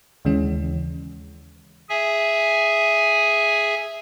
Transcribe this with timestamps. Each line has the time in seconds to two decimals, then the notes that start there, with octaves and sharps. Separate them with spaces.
0.25 D#2 C#3 E3 G#3 C#4
1.89 G#4 E5 G#5